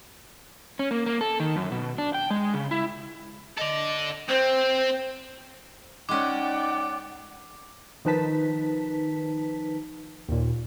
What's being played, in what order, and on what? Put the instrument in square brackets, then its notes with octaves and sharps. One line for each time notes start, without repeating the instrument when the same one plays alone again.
[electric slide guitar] C#4
A#3
A#3
A4
D#3
F#2
B2
D4
G5
G#3
C#3
E4
[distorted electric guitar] A4 D5 [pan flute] D#5
[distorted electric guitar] C4 [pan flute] C5
[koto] G#3 C#4 [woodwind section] D#4 F#5 [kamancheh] D5 G5 [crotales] D6
[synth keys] D#3 F3 D#4 B4 A5 B6
D#2 A#2